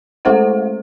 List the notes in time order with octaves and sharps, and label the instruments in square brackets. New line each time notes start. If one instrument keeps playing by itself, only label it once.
[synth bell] G#3 A3 E4 A4 C5 F#5